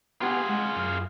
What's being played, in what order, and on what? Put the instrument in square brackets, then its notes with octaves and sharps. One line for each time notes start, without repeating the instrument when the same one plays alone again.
[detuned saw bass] B3 [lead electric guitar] F4 G#4 [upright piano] G4 F#5 G#5
[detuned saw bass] G#3 [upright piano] F#5
[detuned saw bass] F#2 [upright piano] F6